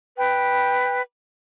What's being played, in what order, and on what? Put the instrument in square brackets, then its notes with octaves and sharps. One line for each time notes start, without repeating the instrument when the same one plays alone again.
[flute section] B4 G5